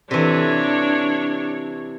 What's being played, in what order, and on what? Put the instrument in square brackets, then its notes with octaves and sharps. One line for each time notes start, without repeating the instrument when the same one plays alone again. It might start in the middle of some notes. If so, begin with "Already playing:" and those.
[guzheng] C3 E3 [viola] D4 C#5